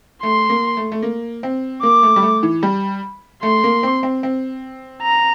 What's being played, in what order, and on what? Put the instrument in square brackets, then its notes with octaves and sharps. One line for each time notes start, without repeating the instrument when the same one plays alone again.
[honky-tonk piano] A3 [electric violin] C6
[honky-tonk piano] A#3
A3
A3
A#3
C4
[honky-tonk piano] A#3 [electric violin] D6
[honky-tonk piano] A3
G3
A3
E3
G3
[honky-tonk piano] A3 [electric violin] C6
[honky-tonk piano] A#3
C4
C4
C4
[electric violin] A#5